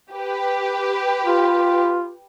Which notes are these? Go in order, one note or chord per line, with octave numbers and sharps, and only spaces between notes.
G4 B4
F4